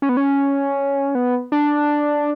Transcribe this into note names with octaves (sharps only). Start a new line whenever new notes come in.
C#4
B3
C#4
B3
D4